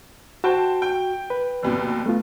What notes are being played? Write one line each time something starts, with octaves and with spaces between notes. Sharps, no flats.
F#4 C5 G5 A5
G5
B4
F1 D#2 B2
A3 B3 F4